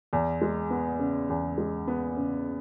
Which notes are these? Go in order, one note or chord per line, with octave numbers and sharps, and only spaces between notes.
E2
G#3
B3
C#3
E2
G#3
B3
C#3